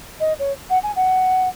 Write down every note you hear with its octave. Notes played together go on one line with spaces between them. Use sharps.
D#5
C#5
F#5
G#5
F#5